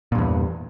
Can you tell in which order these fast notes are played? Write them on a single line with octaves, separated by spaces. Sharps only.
A#2 G2 E2